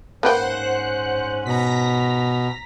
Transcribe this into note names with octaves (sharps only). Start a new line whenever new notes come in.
G#2 A#3 C#4 B4 C5 F#5 G5 F#6
B2 A#5 A#6 B6